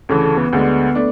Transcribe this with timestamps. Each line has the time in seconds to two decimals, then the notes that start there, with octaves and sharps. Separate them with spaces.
0.09 D2 C#3 E3 A4
0.24 A4
0.38 B3
0.53 D2 D3 G#3
0.95 A3 D4